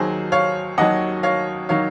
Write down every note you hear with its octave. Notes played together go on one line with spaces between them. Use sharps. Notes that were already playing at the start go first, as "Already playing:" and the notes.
Already playing: D#2 D#3 F#3 G#4 C5
C#5 F5
D#2 D#3 F#3 D#5 F#5
C#5 F5
D#3 F#3 C#5 F5